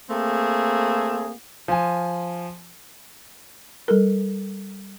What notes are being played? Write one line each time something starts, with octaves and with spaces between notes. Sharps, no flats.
A3 A#3 C4 G#4
F3 G#5
G3 A4 A#4